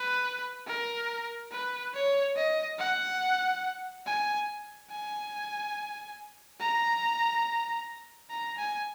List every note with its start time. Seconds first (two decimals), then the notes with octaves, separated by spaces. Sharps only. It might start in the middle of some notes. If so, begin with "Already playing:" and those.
Already playing: B4
0.67 A#4
1.52 B4
1.94 C#5
2.36 D#5
2.79 F#5
4.06 G#5
4.90 G#5
6.60 A#5
8.30 A#5
8.58 G#5